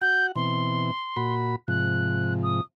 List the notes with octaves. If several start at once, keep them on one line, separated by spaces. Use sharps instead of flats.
F#4 F#5 G6
B2 E3 C4 C6
A#2 F#4 B5
G#2 C3 F3 F#6
D#6